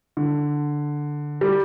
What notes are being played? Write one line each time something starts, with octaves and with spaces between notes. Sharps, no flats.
D3
G3